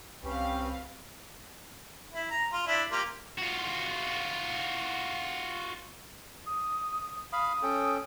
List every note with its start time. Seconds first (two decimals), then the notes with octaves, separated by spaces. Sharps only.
0.23 C2 C4 C#4 G4 B4 F5
2.14 E4
2.31 A#5
2.53 F4
2.67 D4 E4 E5
2.91 A#3 F4 G4
3.39 F4 F#4
6.47 D#6
7.33 F5 B5 D#6
7.63 C#4 A4 G5